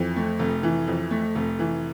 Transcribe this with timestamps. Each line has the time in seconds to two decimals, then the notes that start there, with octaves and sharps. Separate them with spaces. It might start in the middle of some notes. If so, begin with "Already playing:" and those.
Already playing: F2 E3
0.16 A3
0.39 F1
0.63 E3
0.88 F2
1.11 A3
1.35 F1
1.59 E3